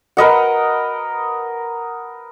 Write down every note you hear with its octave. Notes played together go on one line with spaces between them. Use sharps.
A#4 B4 D#5 F#5